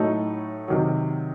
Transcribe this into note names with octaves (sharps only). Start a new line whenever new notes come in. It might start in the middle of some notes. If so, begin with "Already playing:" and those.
Already playing: A2 F#3 A3 D#4
C3 D#3 F#3